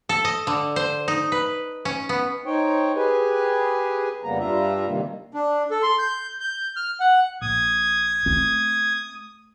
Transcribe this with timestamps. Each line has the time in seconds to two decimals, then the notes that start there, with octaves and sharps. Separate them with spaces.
0.09 A4
0.25 D#5
0.47 D3
0.76 C5
1.08 D#4
1.32 B4
1.85 C#4
2.09 B3
2.46 D#4 C5 C#5 G5
2.96 G4 G#4 B4 G#5
4.24 F2 C#3 G3 A#3 B3 A#5
4.39 G2 G3 D4 F4 E5 A#5
4.87 C3 D#3 G3 A#3
5.34 D4
5.71 A4
5.83 C6
5.99 G6
6.40 G6
6.76 F6
7.00 F#5
7.42 A#1 A#2 D#6 G#6
8.26 A3 C4